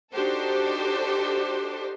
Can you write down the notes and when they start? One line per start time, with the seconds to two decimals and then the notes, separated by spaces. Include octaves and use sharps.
0.13 D4 D#4 F#4 G4 A4 C5